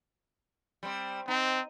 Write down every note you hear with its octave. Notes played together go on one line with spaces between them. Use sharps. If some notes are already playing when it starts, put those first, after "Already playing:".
G3 C4
C4 D#4